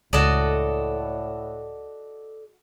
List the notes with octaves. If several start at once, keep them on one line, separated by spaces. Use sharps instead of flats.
C#2 A2 F#4 A4 D5 D#5